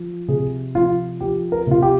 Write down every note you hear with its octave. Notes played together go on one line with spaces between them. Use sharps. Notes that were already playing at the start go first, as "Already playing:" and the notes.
Already playing: F3
C3 G#4
F3 F4
F3 G4
A#4
C3 F4
G4